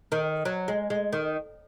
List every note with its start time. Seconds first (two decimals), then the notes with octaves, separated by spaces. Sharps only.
0.12 D#3
0.45 F#3
0.68 G#3
0.90 G#3
1.12 D#3